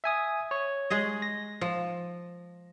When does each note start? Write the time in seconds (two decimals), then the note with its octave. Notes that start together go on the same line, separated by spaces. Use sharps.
0.04 E5 G#5 D#6
0.51 C#5
0.90 G#3 G#4 D#5
1.22 A#6
1.61 F3